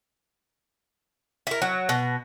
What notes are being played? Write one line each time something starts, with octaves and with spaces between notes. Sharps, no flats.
E4 A#4
F#3
B2